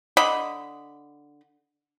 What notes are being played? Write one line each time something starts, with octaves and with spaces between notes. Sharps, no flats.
D3 D#5 B5